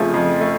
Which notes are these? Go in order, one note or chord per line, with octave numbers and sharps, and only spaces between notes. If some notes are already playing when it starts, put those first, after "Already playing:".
Already playing: F2 C#3 F3 A3
F2
A3